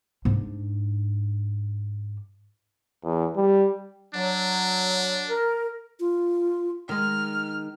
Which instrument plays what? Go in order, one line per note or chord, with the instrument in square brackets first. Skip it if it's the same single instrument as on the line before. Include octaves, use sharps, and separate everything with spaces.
[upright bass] G#2 D4
[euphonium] E2
G3
[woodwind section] F#3 [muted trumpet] D4
[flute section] A#4
[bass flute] F4
[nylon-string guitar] D#3 G#3 [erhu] F6